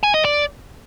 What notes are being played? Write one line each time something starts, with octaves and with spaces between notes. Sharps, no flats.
G#5
D#5
D5